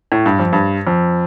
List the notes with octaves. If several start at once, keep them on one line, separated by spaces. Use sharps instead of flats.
A2
G2
F2
G2
F2